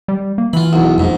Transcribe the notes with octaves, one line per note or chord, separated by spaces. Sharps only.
G3
A#3
E3 F4 B5
B1 E2
A#1 F2 G#2